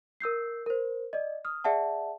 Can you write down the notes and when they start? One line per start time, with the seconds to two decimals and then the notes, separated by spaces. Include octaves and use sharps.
0.20 A#4 E6 G6 C7
0.66 A#4 C5
1.13 D5 D#5
1.45 D#6 F6
1.64 G#4 D5 E5 F#5 A5